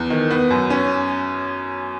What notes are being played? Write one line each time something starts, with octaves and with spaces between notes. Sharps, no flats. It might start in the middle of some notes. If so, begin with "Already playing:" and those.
Already playing: E2
D#3
B3
F#2
C#4